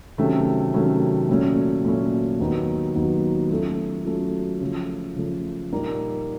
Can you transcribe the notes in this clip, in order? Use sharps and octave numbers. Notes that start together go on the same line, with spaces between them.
C3 D#3 F#3 A3 C#4
C3 D#3 F#3 A3 C#4
A#2 F#3 A3 C#4
A#2 F#3 A3 C#4
D#2 D#3 F#3 B3 D#4
D#2 D#3 F#3 B3 D#4
F#3 A3 C#4 F4 A4
F#3 A3 C#4 F4 A4
C#3 F3 A3
C#3 F3 A3
A#2 G3 A#3 D#4